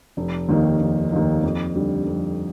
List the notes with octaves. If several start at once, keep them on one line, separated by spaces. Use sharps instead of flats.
F1
D#2 D#3 A#3 D#4
F1
D#2 D#3 A#3 D#4
F2
D3 G3
F2